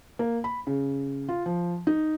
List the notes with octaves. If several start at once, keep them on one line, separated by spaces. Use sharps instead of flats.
A#3
B5
C#3
F4
F3
D#4